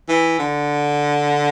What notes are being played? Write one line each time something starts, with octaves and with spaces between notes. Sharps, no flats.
E3
D3